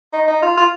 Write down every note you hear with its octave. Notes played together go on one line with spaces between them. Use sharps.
D#4
D#4
F4
F4